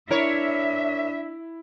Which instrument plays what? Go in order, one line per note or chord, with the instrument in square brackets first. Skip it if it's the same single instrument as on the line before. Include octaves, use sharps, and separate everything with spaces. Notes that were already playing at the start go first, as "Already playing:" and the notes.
[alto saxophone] D4 [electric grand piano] E4 [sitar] A#4 C#5 [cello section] E5